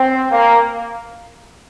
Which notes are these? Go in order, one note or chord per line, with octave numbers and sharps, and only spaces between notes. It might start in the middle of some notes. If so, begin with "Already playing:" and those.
Already playing: C4
A#3